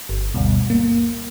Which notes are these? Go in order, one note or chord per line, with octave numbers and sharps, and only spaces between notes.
G1
D2 G2 B2
A#3